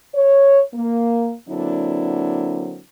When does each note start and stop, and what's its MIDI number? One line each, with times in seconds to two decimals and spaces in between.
0.15 0.60 73
0.74 1.34 58
1.49 2.79 50
1.49 2.79 54
1.49 2.79 58
1.49 2.79 60
1.49 2.79 62
1.49 2.79 64